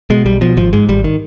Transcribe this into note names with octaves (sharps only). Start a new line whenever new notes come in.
B2 G#3
B1 G3
B2 F3
G#1 F3
G#2 G#3
G#1 G3
D#3